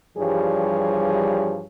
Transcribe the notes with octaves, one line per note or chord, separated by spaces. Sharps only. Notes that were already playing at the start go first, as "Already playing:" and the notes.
G2 E3 F3 G3 G#4 C#5